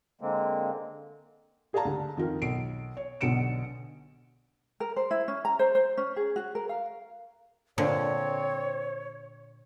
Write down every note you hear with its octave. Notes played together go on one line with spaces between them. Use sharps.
D3 G#3 A#3 C4
G4 G#4 D5 F5 A5 A#5
D2
F2 D#3 F4 F#4 A#4
B1 C7 D7
C#5
B1 B2 D3 C#7 D7 E7
A#4
C5
E4
C#4
A#5
C5
C5
C#4
G#4
F#4
A#4
F5
A#2 D3 C4 C#5